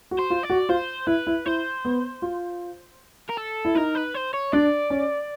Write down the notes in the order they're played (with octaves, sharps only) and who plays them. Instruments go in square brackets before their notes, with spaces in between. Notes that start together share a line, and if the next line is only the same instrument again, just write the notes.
[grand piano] F#4
[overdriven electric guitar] C5
[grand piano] F4
[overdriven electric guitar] D5
[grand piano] F#4
[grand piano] F4 [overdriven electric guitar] C5
[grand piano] E4 [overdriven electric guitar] B4
[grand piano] E4
[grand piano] E4 [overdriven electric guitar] C5
[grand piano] B3
F4
[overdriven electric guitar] A#4
A4
[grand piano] E4
[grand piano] D#4 [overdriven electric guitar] A#4
[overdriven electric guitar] B4
C5
C#5
[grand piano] D4 [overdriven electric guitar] D5
[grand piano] C#4